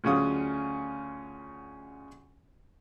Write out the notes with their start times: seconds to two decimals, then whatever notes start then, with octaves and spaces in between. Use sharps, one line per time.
0.04 D2 C#3 F#3 C#4 F4 D#6